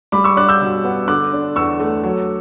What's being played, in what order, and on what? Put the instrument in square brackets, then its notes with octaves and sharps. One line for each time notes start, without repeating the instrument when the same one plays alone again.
[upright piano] G3 B5 D6
C#6 E6
D4 D6 F#6
E6 G6
B2
B3
D3 D6 F#6
D4
E2 C#6 E6
A3
F#3